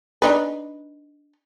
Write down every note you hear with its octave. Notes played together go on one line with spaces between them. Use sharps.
D4 D#4 B4